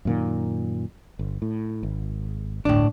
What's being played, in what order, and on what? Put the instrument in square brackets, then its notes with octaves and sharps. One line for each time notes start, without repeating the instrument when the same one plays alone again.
[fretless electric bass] F#2 A#2 D#3
G1
A2
G#1
[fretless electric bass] G1 D2 [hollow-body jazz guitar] A2 D4